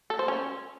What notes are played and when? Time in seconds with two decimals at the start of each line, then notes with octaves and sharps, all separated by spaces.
0.10 A4
0.19 C5
0.28 C#4